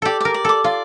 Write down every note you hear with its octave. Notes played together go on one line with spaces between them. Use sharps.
G4 A4 D5
A#4 D5
D5
A4 D6
F4 D5